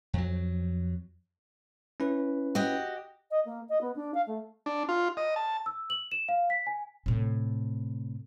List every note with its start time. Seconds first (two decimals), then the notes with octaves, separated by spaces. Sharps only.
0.13 F2 F#3
2.00 C#4 E4 B4
2.55 F#4 G4 D#5
3.30 D#5
3.45 A#3
3.69 D#5
3.81 B3
3.95 D4
4.14 F5
4.26 A3
4.66 D4
4.89 F4
5.17 D#5
5.36 A5
5.66 E6
5.90 F#7
6.12 E7
6.29 F5
6.50 B6
6.67 G#5
7.06 A2 C3